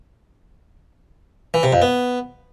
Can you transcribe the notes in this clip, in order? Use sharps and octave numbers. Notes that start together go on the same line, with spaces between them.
E3
C3
F2
B3